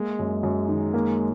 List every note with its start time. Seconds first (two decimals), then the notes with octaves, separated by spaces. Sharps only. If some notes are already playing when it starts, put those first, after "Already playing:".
Already playing: G#3 A#3
0.19 F#2
0.43 F#2
0.68 D#3
0.94 A#3